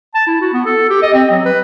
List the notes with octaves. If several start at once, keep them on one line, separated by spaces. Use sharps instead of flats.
A5
E4
F#4
B3
A4
G4
D#5
C4
F#3
B4